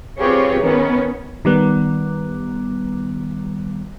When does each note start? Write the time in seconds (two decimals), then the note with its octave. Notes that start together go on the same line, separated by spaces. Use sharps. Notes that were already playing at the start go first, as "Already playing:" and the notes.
0.18 C4 F4 G4 G#4 B4 C#5
0.62 D#3 B3 C#4
1.45 D#3 G3 B3